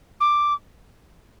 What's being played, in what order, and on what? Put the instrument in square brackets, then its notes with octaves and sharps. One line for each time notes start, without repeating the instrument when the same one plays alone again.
[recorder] D6